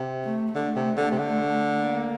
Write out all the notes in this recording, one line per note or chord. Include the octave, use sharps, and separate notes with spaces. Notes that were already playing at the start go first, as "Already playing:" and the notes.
Already playing: C3
A3
D3 A3
C3
D3
C3
D3
A#3